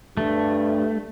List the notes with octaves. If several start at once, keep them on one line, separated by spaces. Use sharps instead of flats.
G2 A3